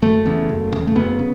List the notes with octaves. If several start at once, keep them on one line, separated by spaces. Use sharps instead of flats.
F#1 A3
E2 C#3
F#1
E2 C#3
A3
F#1 B3
C#3